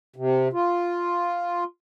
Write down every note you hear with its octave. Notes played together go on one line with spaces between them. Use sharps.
C3
F4